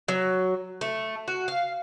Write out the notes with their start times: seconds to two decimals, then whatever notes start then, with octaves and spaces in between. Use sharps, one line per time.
0.08 F#3
0.81 A3
1.28 F#4
1.48 F5